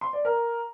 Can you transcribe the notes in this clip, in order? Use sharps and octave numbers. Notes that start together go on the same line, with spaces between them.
C6
D5
A#4